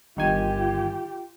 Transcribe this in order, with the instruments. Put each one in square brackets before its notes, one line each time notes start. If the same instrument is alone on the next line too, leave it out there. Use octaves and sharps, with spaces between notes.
[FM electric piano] G1 D#3 G#5 [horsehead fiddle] F4 G4